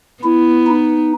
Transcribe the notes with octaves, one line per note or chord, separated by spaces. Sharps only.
B3 E4
D#4